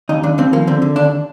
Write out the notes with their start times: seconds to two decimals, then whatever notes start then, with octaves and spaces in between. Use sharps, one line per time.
0.09 D#2 D#4
0.23 D#2 D4
0.38 D#2 C4
0.53 F3 A#3
0.67 D3 C4
0.82 D3
0.96 D#2 D4